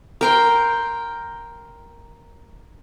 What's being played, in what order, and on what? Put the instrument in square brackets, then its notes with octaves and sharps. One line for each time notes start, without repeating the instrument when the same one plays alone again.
[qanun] A#4 G5 C6